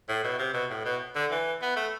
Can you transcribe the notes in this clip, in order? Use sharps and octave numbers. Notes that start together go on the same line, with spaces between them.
A2
B2
C3
B2
A2
B2
D3
E3
B3
A3